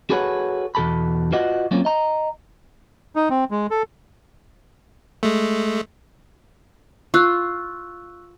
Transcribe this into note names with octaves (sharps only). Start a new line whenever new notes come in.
F#4 G#4 A4 B4 C#5 F#5
E2 B2 A4 A5 B5
F4 F#4 B4 D5 D#5 F#5
F#3 A#3 C4 C#4 F4 D5
D#5 A#5
D#4
C4
G#3
A4
G#3 A3
F4 C#6 E6 F#6